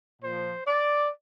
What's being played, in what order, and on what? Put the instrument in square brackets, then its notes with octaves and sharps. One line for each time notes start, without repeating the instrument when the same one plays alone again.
[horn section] A#2 F3 C5
D5